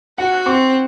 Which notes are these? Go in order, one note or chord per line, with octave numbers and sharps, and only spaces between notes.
F#4 F#5
C4 C#6